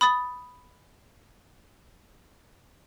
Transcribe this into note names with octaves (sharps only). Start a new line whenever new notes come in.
B5 D#6 A6